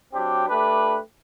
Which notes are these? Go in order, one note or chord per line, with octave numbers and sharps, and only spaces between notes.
F#3 C4 D4 G4
A3 D4 G4 B4